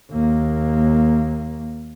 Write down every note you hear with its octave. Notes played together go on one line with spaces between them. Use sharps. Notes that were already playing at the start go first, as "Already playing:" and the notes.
D#2 A#3